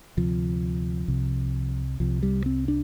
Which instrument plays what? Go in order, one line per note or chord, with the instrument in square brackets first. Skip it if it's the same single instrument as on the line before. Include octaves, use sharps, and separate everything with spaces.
[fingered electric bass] D2 C3 F3
C2 C3
C2 C3 F3
G3
C4
D4